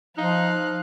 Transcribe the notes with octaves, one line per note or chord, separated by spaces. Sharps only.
F3 D#4 F5 F#6